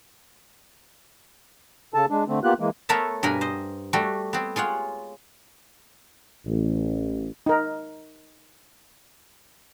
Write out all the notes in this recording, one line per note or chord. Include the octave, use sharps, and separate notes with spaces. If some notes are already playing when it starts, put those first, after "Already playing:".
C#3 A4 A5
G#3 D4
D3 A3 C4
A#3 B3 F4 G4 F#6
E3 G#3 A#3
A3 B3 A4 A#4 C#5 E5
G2 B2 A#4 G#5 B5
C5 D#5
G3 A3 F#4
B3 C4
G#3 F4 C#5 F#5
A1
D#4 A#4